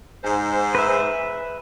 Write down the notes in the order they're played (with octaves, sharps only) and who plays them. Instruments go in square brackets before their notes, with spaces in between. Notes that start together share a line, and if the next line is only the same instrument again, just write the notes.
[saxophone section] G#2 C5
[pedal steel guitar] B4 E5